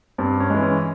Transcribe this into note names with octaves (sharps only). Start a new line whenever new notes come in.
G2 C4
C#4
E3 G#3
C#4